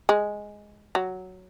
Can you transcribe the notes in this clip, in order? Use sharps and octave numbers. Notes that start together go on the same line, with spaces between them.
G#3
F#3